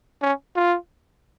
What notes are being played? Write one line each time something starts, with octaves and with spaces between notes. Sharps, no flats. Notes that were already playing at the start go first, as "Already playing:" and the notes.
C#4
F4